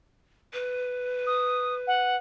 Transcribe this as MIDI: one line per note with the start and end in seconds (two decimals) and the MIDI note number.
0.53 2.17 71
1.27 1.75 87
1.87 2.16 78